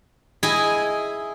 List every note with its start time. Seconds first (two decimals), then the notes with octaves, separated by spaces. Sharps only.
0.43 E4 G#4 D#5